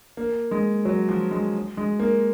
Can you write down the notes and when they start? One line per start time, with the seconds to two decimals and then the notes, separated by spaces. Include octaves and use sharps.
0.17 A#3
0.51 G#3
0.85 F#3
1.09 F3
1.31 G#3
1.77 G#3
2.00 A#3